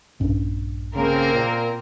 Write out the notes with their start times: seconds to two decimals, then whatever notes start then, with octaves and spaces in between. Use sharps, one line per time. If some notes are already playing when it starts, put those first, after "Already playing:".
0.20 A#1 G2 C#4
0.96 C#3 A#3 C4 A#4
1.33 A#2